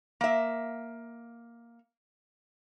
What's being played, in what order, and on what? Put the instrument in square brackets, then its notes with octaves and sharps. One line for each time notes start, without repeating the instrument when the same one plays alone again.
[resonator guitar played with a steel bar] A#3 E5